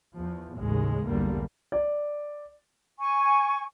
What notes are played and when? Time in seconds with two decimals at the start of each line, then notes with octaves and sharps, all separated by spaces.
0.15 E2 F3
0.57 A1 D#2 C#3 G#3
1.06 B1 E2 G2 D3 G3 A#3
1.72 D5
2.99 G#5 C#6